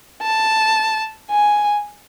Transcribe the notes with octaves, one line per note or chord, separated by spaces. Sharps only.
A5
G#5